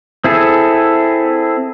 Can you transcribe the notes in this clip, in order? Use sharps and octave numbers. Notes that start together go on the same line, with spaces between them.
C4 E4 G#4 A4